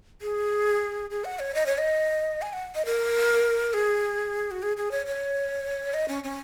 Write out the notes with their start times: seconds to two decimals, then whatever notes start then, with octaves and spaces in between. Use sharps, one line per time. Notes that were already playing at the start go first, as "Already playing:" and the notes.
0.21 G#4
1.10 G#4
1.24 F#5
1.39 C#5
1.55 D#5
1.66 C#5
1.78 D#5
2.42 G#5
2.53 F#5
2.75 D#5
2.85 A#4
3.73 G#4
4.51 F#4
4.62 G#4
4.77 G#4
4.91 C#5
5.06 C#5
5.94 D#5
6.08 C#4
6.24 C#4